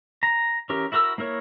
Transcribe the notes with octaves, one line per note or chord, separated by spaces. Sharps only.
A#5
E3 C#4 G4 A#4
E4 F#4 A#4 D#6 E6
A#3 E4 A#4 C#5